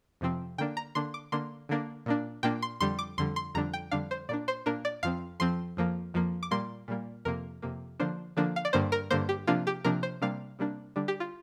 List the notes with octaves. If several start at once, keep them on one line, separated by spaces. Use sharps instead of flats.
F2 C3 F3 C4
D3 A#3 D4 G5
A#5
D3 A#3 D4 C6
D6
D3 A#3 D4 C6
D3 A#3 D4
A#2 A#3 D4
A#2 A#3 D4 G5
C6
F2 D3 G3 C6
D6
F2 D3 G3 C6
C6
F2 D3 G3 D4 A#5
G5
F2 D3 G3 D4 F5
C5
A#2 A#3 D4 D5
C5
A#2 A#3 D4 A#4
D5
F2 F3 C4 F5
F2 F3 C4 C6
F2 F3 A#3
F2 F3 A#3
D6
A#2 G3 A#3 C6
A#2 G3 A#3
F2 C3 A#3 A#4
F2 C3 A#3
D3 F3 A#3 D4 C5
D3 F3 A#3 D4
F5
D5
G2 D3 A#3 C5
A#4
G2 D3 A#3 C5
G4
C3 F3 A#3 D4 F4
G4
C3 F3 A#3 D4 A#4
C5
C3 G3 A#3 D4 F5
C3 G3 A#3 D4
D3 G3 D4
G4
F4